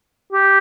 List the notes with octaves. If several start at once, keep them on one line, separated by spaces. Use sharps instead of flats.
G4